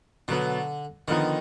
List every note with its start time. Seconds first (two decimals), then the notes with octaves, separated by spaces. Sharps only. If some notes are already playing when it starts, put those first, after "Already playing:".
0.28 B2 D3 F#3 B3
1.08 D3 D#3 F3 B3 D#4